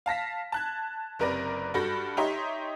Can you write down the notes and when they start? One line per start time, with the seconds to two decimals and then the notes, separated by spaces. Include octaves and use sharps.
0.06 F5 A5 A#6 B6
0.52 A5 F#6 G#6
1.19 F#1 C3 A#4 B4 D5 A#6
1.74 G2 F#4 A4 B5 G6 A#6
2.17 D#4 G4 C#5 E5 A#5 C6